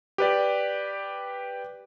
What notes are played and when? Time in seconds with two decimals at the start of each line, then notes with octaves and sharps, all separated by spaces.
0.18 G4 B4 D5